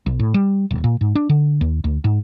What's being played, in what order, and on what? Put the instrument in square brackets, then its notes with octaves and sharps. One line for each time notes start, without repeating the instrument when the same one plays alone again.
[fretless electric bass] B1
A2
G3
D#1
A#2
G#2
D4
D3
D#2
D2
G#2